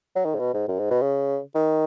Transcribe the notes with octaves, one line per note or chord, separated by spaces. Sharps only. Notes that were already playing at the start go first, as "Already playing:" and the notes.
F#3
D#3
G#2
B2
G#2
F#2
G#2
B2
C#3
D#3